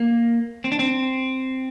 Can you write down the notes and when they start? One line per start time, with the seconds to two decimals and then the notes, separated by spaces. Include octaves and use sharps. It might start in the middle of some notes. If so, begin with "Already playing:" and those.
Already playing: A#3
0.64 C4
0.72 D4
0.79 C4